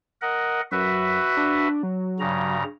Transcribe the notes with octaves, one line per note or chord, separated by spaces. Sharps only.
A#4 D#5 F#5
F#2 F#4 B4 E5
D4
F#3
G2 C#3 A#5